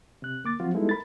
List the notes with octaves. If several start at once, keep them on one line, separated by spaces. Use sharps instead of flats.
C3 F#6
D2 A#3 D6 A6
F3 F#3 C4 F4 F#4
G3 G#3 B3 D#4 E4 A4
A#4 B5 A6